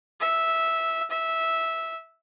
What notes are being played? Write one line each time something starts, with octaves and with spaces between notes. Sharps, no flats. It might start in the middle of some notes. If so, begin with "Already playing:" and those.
E5
E5